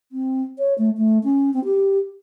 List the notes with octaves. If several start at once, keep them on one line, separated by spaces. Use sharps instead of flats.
C4
C#5
A3
A3
C#4
C4
G4